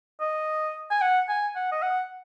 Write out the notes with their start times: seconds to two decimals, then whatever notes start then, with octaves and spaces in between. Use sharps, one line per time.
0.21 D#5
0.90 G#5
1.02 F#5
1.29 G#5
1.56 F#5
1.72 D#5
1.82 F#5